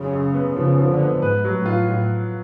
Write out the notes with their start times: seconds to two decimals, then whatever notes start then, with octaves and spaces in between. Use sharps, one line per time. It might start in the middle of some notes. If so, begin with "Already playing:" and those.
Already playing: F#2 C#3
0.12 F#2
0.33 B3
0.56 C#3 F3
0.78 F3
0.89 D3
1.00 B3
1.22 G#2 B4
1.44 F#3
1.55 A2
1.66 F4
1.88 F4